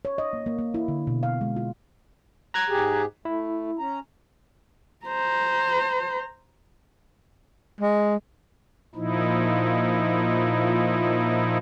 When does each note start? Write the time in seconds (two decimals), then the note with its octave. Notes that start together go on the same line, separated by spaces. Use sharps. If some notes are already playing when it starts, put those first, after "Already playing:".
0.05 C#5
0.18 D#5
0.33 A#3
0.46 A#3
0.59 A#3
0.74 E4
0.88 D3
1.07 B2
1.23 F5
1.41 G#3
1.56 F4
2.54 A#5 F#6 G#6
2.69 G#2 G4 G#4
3.25 A3 E4
3.79 C#4 A#5
5.05 C5 A#5
7.81 G#3
8.95 A#2 F3 D#4 E4